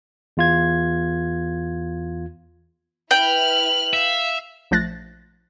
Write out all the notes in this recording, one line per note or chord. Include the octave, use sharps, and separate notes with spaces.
E2 F4 G#6
E4 B4 G5 F6 F#7
E5 F5
A#1 F3 A3 F#6 A6 A#6